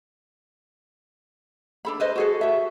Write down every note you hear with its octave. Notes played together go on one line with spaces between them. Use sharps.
D4 A4 B5
B4 C5 D#5
F#4 G#4 A4
F#4 E5